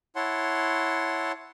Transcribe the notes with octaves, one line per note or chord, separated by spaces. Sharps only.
E4 C#5 F#5 A5 C6